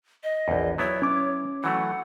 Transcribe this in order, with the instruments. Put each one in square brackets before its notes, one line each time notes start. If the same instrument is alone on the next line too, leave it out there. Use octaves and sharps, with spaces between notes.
[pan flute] D#5
[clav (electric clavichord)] A#1 E2
[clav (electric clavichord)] F#3 B3 E4 [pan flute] C#5
[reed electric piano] C#4 D6
[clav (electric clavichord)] E3 F#3 A3 [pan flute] F#5